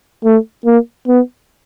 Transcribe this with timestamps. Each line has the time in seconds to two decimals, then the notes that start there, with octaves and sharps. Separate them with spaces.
0.25 A3
0.66 A#3
1.08 B3